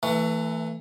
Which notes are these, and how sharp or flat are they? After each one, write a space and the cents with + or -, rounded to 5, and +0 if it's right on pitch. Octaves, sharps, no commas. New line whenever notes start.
E3 +0 A3 +30 C#6 +15